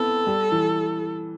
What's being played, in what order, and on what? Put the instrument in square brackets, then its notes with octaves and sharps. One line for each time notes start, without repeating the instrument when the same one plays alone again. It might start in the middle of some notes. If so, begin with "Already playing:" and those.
Already playing: [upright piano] B3 C4 E4 [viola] A4
[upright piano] G3
E3